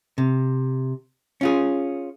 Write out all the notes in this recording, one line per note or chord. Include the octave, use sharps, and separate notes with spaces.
C3
C#4 F4 G#4